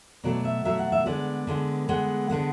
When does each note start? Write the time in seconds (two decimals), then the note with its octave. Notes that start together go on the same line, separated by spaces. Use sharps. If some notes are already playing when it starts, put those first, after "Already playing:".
0.24 B2 F#3 A3 D5
0.45 E5
0.65 B2 F#3 A3 E5
0.78 F#5
0.92 E5
1.06 D3 G#3 B3 D5
1.47 D3 G#3 B3
1.88 D3 G#3 B3 F#5
2.30 D3 G#3 B3